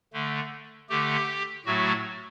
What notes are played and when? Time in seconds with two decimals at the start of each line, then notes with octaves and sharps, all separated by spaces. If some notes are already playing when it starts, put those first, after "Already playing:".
0.13 D3 A3
0.89 D3 A3 G4
1.66 A2 F#3 A3 F#4